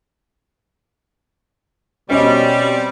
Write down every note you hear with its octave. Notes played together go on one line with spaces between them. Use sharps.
B2 G3 C4 C#4 D#5